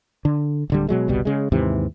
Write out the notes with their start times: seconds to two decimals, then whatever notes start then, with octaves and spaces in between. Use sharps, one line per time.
0.25 D3
0.70 D1 D3 G3
0.88 B2 F#3 G#3
1.08 G1 C2 B2 G3
1.25 C#3 G#3
1.52 D#2 G#2 C3 E3